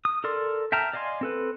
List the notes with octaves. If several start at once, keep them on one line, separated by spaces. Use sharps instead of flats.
D#6
A4 A#4 D5 C6
E5 G5 A5 A#5 F6
D5 D#5 F5 G#5 C6
C4 A4 B4